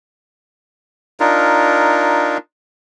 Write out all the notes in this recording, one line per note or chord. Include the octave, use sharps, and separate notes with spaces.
D4 D#4 F4 A#4